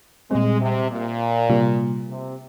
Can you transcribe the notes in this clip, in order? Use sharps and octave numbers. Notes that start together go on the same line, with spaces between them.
A#2 G3 G#3 C4
C3
A#2
C3 G3 A#3 F4
C3